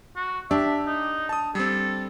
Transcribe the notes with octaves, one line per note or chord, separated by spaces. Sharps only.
F#4
D4 G4 E5
D#4
A5 D#6
G3 C4 A4